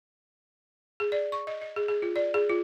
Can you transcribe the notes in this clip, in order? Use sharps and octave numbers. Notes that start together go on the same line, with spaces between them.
G#4
D5
C#6
D#5
D#5
G#4
G#4
F4
D5
G#4
F4